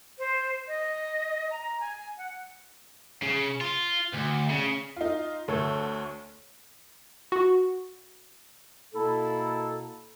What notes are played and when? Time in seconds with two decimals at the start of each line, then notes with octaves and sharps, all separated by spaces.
0.19 C5
0.68 D#5
1.50 A#5
1.80 G#5
2.18 F#5
3.23 C#3
3.61 F4
4.13 D2
4.50 C#3
4.96 D#4 F4
5.48 D2 A3 A4 C#5
7.32 F#4
8.94 B2 A#3 E4 A4